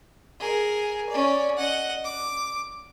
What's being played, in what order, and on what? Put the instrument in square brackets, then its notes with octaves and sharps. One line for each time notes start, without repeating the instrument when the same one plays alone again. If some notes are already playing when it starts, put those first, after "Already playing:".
[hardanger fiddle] G#4 A#4
C#4 D5
D#5 F#5
D6